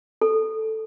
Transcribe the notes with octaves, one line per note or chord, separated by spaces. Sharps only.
A4